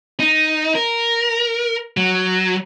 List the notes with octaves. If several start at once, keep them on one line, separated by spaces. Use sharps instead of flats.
D#4
A#4
F#3